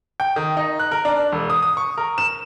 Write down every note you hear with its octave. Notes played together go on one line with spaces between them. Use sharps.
G5
D#3
D#4
F#6
A#4
D4
E1
D#6
D#6
C#6
A#4
E7